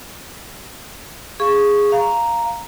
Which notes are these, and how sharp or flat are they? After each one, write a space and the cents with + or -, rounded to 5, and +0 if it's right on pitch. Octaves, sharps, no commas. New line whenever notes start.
G#4 -10 F5 +0 C#6 +0
F5 +0 A#5 +0